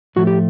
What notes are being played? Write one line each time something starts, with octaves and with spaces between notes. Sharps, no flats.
A2 F3 A3 F#4
G4